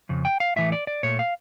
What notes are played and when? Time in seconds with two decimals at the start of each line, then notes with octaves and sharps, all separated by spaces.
0.09 F2 C#3
0.25 G5
0.40 F5
0.56 A2 E3 A3 E5
0.72 D5
0.87 D5
1.03 A#2 A3 C#5
1.19 F5